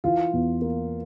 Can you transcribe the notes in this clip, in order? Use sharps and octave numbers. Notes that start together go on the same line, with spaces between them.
E3 F4
E2
A#3